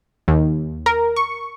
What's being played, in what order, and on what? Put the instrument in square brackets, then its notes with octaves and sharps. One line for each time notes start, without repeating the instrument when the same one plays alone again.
[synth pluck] D#2
A#4
C#6